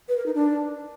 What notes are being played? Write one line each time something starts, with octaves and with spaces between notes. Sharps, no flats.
B4
A#4
D#4
D4